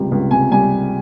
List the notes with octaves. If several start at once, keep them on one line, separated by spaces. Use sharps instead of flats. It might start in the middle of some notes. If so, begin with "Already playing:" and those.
Already playing: C#2 C3 G3
C#2
C3 G#5
G3 G#5